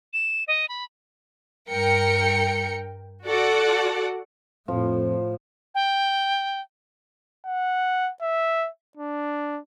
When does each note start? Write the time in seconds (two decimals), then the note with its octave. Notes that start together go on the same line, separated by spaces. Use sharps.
0.13 E7
0.48 D#5
0.68 B5
1.70 G2 A#4 G5 C#7
3.27 F#4 A4 D5 F#5
4.68 F2 A2 F3
5.75 G5
7.46 F#5
8.22 E5
8.98 D4